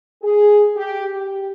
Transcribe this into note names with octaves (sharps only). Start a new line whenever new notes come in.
G#4
G4
G4